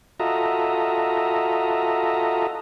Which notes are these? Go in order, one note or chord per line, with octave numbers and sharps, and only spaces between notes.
F4 F#4 A4 D#5 E5 A#5